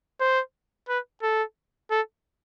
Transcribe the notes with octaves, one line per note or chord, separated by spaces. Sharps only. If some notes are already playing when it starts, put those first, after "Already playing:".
C5
B4
A4
A4